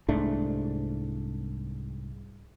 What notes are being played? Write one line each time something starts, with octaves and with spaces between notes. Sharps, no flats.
C2 G#2 A3 D4